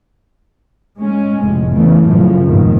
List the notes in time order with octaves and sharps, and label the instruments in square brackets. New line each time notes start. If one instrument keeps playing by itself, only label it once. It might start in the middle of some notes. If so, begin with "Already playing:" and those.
[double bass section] G#3 C#4
F1 A2 G#3
E2 C#3 E3 A3
F#2 A2 C#3 F3
F#1 F2 G#2 B2 D#3